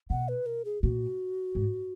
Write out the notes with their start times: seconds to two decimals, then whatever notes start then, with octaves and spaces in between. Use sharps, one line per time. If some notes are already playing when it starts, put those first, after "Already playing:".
0.10 B2 F#5
0.28 B4
0.46 A#4
0.65 G#4
0.83 A#2 F#4
1.55 G#2